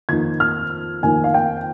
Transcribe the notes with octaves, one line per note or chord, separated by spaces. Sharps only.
F2 D#3 A#3 D#4 G#6
F6
F2 D#3 A#3 D#4 G#5
F5
G5